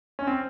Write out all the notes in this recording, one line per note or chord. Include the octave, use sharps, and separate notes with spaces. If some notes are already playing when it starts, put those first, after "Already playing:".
C#4
C4